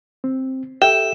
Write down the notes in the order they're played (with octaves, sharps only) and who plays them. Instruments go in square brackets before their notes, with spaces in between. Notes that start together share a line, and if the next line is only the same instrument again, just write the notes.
[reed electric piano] C4
[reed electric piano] G4 A4 E5 [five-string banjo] G5 [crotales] E7